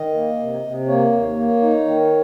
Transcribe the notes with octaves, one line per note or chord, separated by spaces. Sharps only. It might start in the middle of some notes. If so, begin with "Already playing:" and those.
Already playing: D#3 D#5
A#3
C3
C3
A#3 C#5
D#2
A#3
D#4
D#3